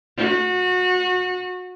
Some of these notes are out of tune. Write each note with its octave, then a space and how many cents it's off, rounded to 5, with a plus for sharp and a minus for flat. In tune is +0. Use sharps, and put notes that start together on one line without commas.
F#4 -25